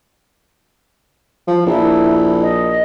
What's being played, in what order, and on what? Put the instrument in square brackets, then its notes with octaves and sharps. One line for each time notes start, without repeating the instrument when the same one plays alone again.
[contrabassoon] F3
[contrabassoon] A#1 [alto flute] E4
[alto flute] D#5